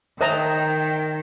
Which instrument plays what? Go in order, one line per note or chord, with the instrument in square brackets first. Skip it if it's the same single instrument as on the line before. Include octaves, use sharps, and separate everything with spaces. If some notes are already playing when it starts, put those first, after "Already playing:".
[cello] D#3 [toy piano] A#4 C5 E5 [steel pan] D#5 A5 A#5 [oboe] G5